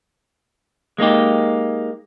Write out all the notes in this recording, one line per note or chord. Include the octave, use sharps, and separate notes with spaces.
G#3 A#3 D#4 G4